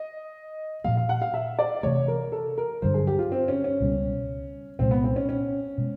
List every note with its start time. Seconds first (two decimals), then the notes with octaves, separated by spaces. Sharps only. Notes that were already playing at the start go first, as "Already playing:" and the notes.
Already playing: D#5
0.84 A#2 F3 A#3 F5
0.97 F5
1.09 F#5
1.22 F5
1.34 E5
1.59 D5
1.83 C3 E3 A3 C#5
2.08 A#4
2.32 A4
2.58 A#4
2.82 G2 D3 F#3 C5
2.94 G#4
3.07 G4
3.19 F4
3.32 C4
3.48 C#4
3.64 C#4
3.80 C#2 B2 G3
4.79 C2 A#2 F3 G#3 C4
4.91 B3
5.04 C4
5.16 C#4
5.29 C#4
5.78 B2 G#3